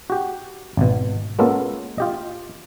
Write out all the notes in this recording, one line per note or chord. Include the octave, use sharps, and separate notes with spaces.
F#4 G4
G#1 B2
G#3 A#3 B3 C#4 F4 A4
F4 G4 D#5